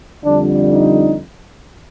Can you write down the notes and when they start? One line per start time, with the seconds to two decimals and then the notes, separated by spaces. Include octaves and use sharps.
0.24 F2 D3 G3 D4
0.72 D#4